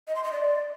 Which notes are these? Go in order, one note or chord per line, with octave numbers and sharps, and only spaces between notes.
D#5
C6
D#5
D5